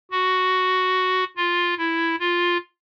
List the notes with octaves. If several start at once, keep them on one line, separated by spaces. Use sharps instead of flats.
F#4
F4
E4
F4